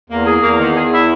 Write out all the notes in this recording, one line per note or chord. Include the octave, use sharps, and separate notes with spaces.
E2 A#3
G#4
E2 A#3
D#3
G#4
E4